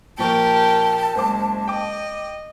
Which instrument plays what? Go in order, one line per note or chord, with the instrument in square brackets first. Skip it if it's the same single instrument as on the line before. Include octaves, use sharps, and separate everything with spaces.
[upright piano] A#2 F3 C#6 [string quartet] G4 A#4 [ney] A5
[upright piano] F#1 C5 D6 [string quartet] G#3
[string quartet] D#5 [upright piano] G5 D6